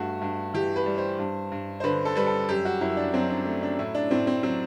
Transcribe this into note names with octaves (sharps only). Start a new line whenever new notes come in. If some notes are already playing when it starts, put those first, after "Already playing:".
Already playing: G2 A3 F#4
G2
E3 G4
B4
G3
C5
G2
G2
C5
D3 B4
A4
G3 B4
A4
F#2 G4
F#4
F#2 E4
D4
F#3 C4
D4
A3
D4
A2 E4
D4
A2 C4
C4
F#3 C4